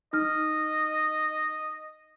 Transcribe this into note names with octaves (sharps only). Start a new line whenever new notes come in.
D#4 D#5 F6